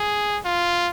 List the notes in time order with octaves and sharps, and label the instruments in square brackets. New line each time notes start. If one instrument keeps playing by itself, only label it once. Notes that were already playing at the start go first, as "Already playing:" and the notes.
Already playing: [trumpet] G#4
F4